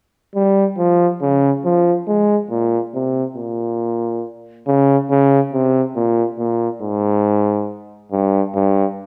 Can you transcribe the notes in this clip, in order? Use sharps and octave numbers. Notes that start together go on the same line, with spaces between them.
G3
F3
C#3
F3
G#3
A#2
C3
A#2
C#3
C#3
C3
A#2
A#2
G#2
G2
G2